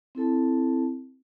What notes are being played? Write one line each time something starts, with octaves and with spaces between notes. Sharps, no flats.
C4 E4 A4 A5